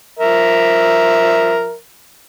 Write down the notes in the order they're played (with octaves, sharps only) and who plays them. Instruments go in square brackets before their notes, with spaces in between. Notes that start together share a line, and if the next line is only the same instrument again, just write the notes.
[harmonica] F3 A#4 E5